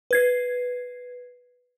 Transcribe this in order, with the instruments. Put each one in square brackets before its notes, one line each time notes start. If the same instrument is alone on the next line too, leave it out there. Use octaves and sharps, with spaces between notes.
[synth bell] B4 G#6 C7